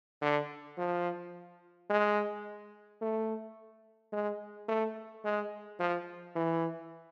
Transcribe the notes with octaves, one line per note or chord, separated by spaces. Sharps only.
D3
F3
G#3
A3
G#3
A3
G#3
F3
E3